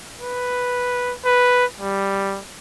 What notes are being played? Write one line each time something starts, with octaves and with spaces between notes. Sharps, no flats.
B4
B4
G3